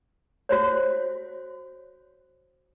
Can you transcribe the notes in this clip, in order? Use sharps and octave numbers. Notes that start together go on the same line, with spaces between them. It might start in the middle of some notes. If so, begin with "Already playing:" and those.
F#4 C5 C#5